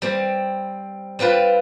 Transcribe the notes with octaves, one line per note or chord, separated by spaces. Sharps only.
G3 C4
G3 C4 F4 B4